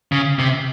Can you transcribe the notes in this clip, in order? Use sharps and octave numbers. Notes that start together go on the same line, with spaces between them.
C#3
C3